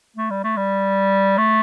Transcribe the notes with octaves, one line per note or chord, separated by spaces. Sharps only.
A3
G3
A3
G3
A3